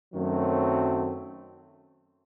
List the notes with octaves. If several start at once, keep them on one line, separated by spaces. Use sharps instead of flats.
F#2 D#3 F#3 A3 C4